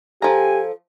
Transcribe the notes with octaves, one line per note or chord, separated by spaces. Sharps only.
F3 G4 A4 G#5 A#5